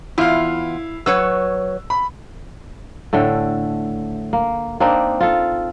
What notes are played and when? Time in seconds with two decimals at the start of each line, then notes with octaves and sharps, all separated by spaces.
0.18 E2 E4 F4 F5
1.06 F#3 B4 C#5 E6
1.90 B5
3.13 A2 D3 A3 G5
4.33 A#3
4.80 A#3 C4 D4 D#4
5.20 F4 A4